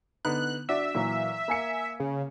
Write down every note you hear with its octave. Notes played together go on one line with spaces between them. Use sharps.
D3 B3 D#4 F#6
D4 F#4 D5 E5
A#2 E3 F#3
A#3 G#5 C#7
C#3